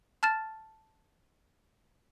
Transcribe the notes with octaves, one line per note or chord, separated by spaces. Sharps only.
A5 F6 A6 E7